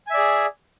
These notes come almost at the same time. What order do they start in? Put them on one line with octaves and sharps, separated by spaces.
G#5 E5 D5 G#4